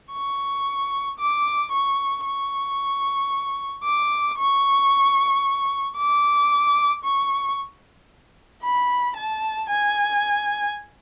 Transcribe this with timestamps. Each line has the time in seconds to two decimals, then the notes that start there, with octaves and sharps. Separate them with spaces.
0.13 C#6
1.19 D6
1.72 C#6
2.25 C#6
3.84 D6
4.38 C#6
5.97 D6
7.04 C#6
8.63 B5
9.17 A5
9.70 G#5